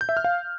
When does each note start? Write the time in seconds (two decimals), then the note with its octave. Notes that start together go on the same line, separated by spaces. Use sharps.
0.01 G6
0.09 E5
0.17 F6
0.24 F5